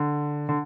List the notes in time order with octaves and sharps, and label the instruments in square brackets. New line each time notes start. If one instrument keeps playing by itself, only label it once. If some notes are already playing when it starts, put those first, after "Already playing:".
Already playing: [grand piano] D3
D3